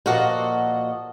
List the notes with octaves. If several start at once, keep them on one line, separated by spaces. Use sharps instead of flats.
A#2 F3 F#4 A4 D#5